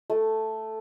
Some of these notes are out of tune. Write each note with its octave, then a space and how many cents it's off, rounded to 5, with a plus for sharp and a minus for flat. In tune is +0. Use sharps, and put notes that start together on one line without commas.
A3 +0